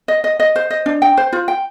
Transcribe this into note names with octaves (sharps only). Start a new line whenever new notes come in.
D#5
D#5
D#5
C5
D#5
D4
G5
C5
F4
G5